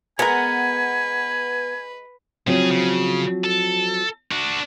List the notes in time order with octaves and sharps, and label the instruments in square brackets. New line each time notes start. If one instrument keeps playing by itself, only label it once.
[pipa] G#3 A#4 [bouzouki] B3 [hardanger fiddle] B4 [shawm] G#5
[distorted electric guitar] C#3 G#4 [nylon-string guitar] F3 F#3 C4
[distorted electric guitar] C#3
A4
D4 F#4